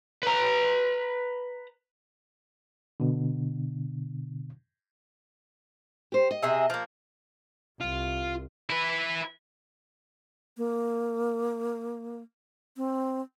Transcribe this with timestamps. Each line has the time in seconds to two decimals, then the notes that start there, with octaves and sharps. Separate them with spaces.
0.23 B4 A#5
3.00 B2 D3
6.12 G4 C5
6.31 D#5
6.43 C3 G#4 E5
6.70 F3 A#3
7.81 C2 F4
8.70 E4 B4
10.57 A#3
12.77 C4